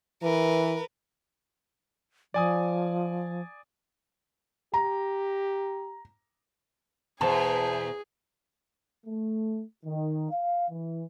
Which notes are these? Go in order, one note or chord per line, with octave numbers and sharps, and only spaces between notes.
E3 A#4 B4
F3 D5 G#5 D#6
G4 A#5
E2 B2 G#4 C5 A5
A3
D#3
F5
E3